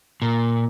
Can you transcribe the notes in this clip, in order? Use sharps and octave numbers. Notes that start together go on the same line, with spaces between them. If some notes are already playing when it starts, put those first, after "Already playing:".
A#2